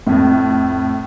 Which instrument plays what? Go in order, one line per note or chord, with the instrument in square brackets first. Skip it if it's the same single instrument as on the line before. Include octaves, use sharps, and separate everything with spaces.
[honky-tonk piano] F2 A2